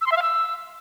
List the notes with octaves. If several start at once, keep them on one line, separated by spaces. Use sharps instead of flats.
E6
C6
E5
F5
E6